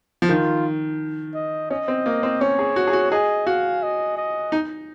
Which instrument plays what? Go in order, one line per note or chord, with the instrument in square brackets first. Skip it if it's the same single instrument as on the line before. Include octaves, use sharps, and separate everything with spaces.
[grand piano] F3
[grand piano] D#3 [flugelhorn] F4
[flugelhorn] D#5
[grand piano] C#4 [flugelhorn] D#5
[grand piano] C4
A#3
C4
[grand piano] C#4 [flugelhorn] C#5
[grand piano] G#4
F#4
G#4
F#4
[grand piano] G#4 [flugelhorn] D#5
[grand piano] F#4 [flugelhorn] F5
[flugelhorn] D#5
D#5
[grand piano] D#4